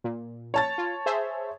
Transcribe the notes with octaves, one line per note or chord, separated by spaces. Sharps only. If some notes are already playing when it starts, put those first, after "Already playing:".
A#2
C#5 A5 A6
F4
G#4 C5 E5